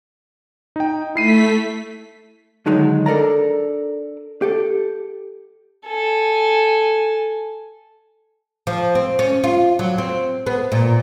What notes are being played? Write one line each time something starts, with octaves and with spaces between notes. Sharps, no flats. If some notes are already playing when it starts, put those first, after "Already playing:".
D#4 G5
A3 E4 B6 C7 D#7
D3 D#3 F#3 G#3 D#4
D4 A4 A#4 D5 A#5
G4 A4
A4 G#5
F3
C4
C#4
F4
F#3
C4
B3
A#2